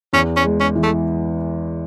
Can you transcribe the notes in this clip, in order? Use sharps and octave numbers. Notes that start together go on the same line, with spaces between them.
E2 C#4
C#4
G#3
C#4
E3
A3